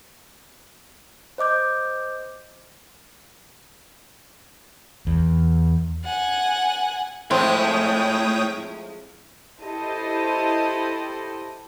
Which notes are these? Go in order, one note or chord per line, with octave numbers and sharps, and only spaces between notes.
C5 D#5 D6 G6
E2
F#5 G#5
F2 A2 G#3 C4 E4 C#5 G5 D#6
E4 G4 A4 C5 D#5